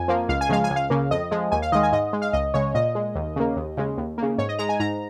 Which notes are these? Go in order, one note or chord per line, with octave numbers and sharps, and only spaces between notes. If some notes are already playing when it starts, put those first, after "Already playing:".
Already playing: F2 G#5
F3 A#3
C#2 F5
G#5
C#3 F3 G#3 F5
G#5
C#2
F5
C#3 A#3
F2 D#5
F3 G#3
D#2 G#5
F5
D#3 G#3 D#5
G#5
G#2 D#5
G#3
F5
C#2 D#5
C#3 G#3 C#5
A#2 D#5
G#3
D#2
C#3 A#3
D#2
C#3 G#3
D#2
C#3 A#3
G#2 C#5
D#5
G#3 A#5
G#5
G#2 A#5